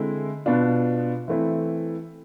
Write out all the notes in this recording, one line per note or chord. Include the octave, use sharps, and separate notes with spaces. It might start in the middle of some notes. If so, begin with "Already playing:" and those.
Already playing: D3 G#3 C4 E4
B2 B3 D4 F4
E3 A3 C4 E4